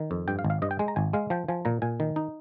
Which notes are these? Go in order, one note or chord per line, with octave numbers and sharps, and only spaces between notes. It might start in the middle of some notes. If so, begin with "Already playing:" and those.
Already playing: D#3
F2
G2 G5
F5
G#1
F5
G2 D#5
G5
G#3 G#5
A#5
G#1 G#5
G#3 F5
F3 G5
F3 G#5
A#2 A#5
A#2 G#5
D#3
D#4